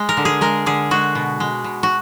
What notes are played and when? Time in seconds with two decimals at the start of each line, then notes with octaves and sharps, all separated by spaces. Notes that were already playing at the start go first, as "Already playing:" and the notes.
Already playing: G#3
0.09 A#4
0.17 D3
0.25 G#4
0.41 G#3 A#4
0.66 D3 G#4
0.91 G#3 F#4
1.15 B2
1.40 G#3
1.64 B2
1.83 F#4